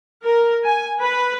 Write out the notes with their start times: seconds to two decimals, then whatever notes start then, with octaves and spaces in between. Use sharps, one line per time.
0.22 A#4
0.66 G#5
1.00 B4